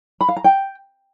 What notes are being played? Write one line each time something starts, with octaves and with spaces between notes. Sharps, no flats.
B5
F5
A#5
G5